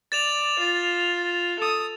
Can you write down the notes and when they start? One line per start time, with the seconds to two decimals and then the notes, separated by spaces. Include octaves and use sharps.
0.12 D5 A6 E7 F7
0.59 F4
1.59 A4 D#6